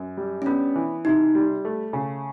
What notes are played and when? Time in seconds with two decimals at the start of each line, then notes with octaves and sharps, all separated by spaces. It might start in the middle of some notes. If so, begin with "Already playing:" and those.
Already playing: F#2
0.17 G3
0.42 C#4
0.46 B3 D4
0.75 E3
1.05 C3 D#4
1.35 G3
1.65 A3
1.93 C#3